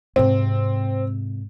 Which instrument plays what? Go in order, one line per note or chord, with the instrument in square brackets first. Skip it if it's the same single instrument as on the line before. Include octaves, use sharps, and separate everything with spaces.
[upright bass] G#2 C3 [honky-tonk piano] C4